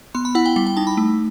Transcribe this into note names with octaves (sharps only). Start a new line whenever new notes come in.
B3 C6
B5
E4 F#5
G5
G3 G5
G5
D#4 A5
B5
A3